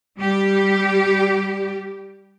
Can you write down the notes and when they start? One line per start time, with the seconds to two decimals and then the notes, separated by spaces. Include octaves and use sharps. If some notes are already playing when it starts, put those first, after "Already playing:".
0.18 G3 G4